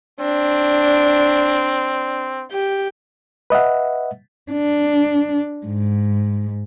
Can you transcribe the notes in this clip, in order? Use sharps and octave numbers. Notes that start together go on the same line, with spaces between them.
C4 D4
G4
B4 D#5 E5 F#5
D4
G#2